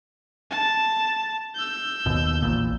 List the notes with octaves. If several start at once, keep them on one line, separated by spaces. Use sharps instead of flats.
A5
E6 G6
D#2 B2
A#1 E2 A#2